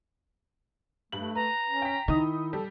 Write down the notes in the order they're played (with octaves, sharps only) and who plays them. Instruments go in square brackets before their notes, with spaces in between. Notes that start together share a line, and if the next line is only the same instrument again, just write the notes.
[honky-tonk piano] G2 F#7 [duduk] A3
[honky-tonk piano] B4 [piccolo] A#5
[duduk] C#4
[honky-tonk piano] G5 B6
[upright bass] D#3 [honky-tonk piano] D#4 D#6 [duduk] E4
[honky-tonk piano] G3 [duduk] A4